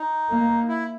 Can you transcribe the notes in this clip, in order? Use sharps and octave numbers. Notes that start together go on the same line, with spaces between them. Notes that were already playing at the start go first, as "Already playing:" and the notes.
Already playing: D#4
A#3
E4